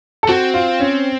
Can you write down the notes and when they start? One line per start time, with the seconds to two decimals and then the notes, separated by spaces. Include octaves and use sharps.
0.23 A4
0.29 C4 F#4
0.54 F4
0.80 C#4